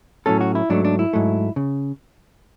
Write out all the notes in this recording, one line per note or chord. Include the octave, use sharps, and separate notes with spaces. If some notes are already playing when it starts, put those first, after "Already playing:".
A2 F#3 A3 C#4 A4
F#4
E4
G#2 F#3 A3 D4
D4
E4
G#2 F#3 A3
C#3